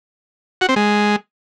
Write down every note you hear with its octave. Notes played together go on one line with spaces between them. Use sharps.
F#4
C4
G#3